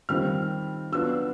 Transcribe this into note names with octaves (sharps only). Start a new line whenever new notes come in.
D#3 G3 C4 F4 F6
F#3 B3 D4 F4 E6